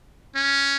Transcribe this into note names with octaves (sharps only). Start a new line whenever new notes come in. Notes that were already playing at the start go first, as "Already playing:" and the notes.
C#4